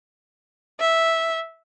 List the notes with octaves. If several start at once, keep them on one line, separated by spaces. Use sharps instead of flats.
E5